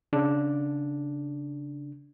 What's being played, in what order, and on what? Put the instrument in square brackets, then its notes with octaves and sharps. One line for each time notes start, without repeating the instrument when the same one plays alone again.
[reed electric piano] C#3 D4